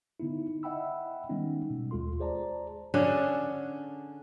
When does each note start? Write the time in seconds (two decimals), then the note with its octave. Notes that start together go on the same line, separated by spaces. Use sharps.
0.20 D3 B3 D#4 E4
0.63 D#5 E5 F#5 G5 B5 E6
1.29 D#3 G3 G#3 B3 C#4 D#4
1.70 B2
1.91 D#2 G#3 F4 A4 C6
2.20 G#4 C5 D5 A5 A#5
2.94 D3 C#4 D4 G#4